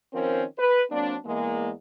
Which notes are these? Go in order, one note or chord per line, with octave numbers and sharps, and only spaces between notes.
D#3 F3 C4 C#4 A#4 C5
B4
F#3 A#3 C4 D4
E2 G#3 A#3